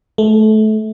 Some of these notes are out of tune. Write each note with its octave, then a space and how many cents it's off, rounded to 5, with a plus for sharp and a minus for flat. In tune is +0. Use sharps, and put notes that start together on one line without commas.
A3 -25